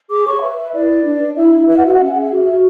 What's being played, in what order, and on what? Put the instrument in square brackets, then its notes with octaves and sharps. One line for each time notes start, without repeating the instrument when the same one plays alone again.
[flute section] G#4 D6
C#5 C#6
B4 E5
B4
E4 D5
B4
D4
D4
E4 E5
E4
B4 E5
F#5
F#4 E5
F#5
C#4 E5
G#4 F#5
E5
F#4
F#4